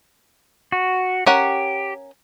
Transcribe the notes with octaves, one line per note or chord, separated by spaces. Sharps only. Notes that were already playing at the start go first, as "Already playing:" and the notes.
F#4
C#4 G4 A#4 F#5